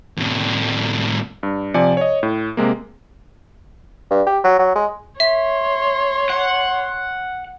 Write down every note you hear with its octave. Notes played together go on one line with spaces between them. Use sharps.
A2 C3
G2
C3 F3 D5 G#5 C#7
C#5 D#5
A2
C3 G#3 A#3
G2
G4
F#3
F#3
G#3
C#5 E5 C6 B6
F#5